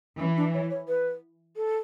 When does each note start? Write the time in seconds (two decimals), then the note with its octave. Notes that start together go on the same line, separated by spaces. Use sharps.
0.19 E3 C#4
0.37 D4
0.54 C#5
0.70 C#5
0.88 B4
1.56 A4